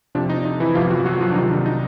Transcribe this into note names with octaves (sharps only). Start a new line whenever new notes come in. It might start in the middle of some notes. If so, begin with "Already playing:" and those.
F2 C3 F3 D4
D#4
D#4
E3 E4
G1 F2 C3 F3 F4
F#3 F#4
F#3 F#4
F3 F4
D4
C2 C3 D#3 D#4
D4
D#4